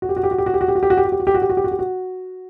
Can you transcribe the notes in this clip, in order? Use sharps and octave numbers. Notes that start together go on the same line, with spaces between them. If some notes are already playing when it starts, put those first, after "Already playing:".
F#4
G4
F#4
G4
F#4
G4
F#4
G4
F#4
G4
F#4
G4
F#4
G4
F#4
G4
F#4
G4
F#4
G4
F#4
G4
F#4
G4
F#4